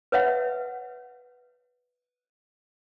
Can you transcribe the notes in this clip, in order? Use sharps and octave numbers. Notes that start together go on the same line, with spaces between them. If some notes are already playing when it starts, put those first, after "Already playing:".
B4 C#5 E5 F#5